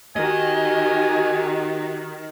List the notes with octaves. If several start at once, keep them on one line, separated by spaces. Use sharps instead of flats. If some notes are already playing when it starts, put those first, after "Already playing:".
D#3 F#4 G4 D#5 G#5